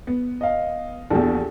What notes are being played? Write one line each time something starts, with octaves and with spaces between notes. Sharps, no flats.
B3
D#5 F5
A#1 E2 G4 A4